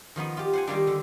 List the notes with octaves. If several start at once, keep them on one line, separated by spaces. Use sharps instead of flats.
D#3 F3 B3 D#4
F4 G4
C5 F#5 G#5
D#3 G3 A#3 D4
D3